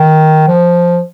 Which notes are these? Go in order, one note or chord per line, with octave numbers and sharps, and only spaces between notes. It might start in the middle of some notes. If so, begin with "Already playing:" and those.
Already playing: D#3
F3